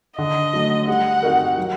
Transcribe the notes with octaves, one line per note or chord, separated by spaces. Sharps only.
D3 D#5
F#3 A3
G3 F#5
C4 D#4 F#4 A#4
F#3